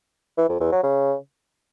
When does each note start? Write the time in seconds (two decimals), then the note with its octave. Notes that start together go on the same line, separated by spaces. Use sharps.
0.38 E3
0.49 F2
0.61 E2
0.72 F#3
0.83 C#3